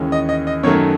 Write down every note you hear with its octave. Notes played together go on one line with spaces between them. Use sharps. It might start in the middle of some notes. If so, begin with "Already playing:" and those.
Already playing: D#2 C#3 E3 G#3 C#4
D#5
D#5
D#5
F#2 D#3 F#3 A3 C#5